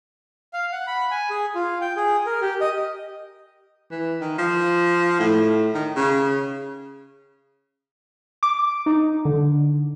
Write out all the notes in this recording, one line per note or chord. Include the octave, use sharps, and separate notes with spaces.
F5
F#5
B5
G#5
G#4
F4
G5
G#4
A#4
G4
D#5
E3
D#3
F3
A2
D#3
C#3
D6
D#4
D3